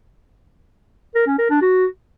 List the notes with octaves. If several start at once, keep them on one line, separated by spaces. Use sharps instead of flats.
A#4
C#4
A#4
D4
F#4